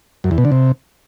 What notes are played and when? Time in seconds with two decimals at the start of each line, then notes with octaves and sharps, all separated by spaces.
0.24 F#2
0.31 E2
0.38 B2
0.45 D3
0.52 C3